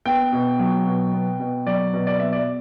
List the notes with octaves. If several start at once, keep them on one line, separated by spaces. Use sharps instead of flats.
B3 G5
B2
F#3
B2
B3
B2
F#3 D5
B2
D5
B3 E5
D5